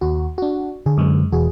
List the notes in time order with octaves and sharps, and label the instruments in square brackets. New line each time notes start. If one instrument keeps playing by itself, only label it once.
[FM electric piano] D#2 F#4
D4 F#4
[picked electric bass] D3 [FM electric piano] G#4
[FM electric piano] F#2 G#3
[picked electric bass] E1 E3 [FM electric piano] F#4 G#4